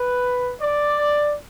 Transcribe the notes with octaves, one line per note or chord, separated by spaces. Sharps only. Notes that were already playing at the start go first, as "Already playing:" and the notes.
Already playing: B4
D5